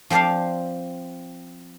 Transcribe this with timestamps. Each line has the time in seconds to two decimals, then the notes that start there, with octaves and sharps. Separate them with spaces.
0.10 F3 C4 C5 D5 F5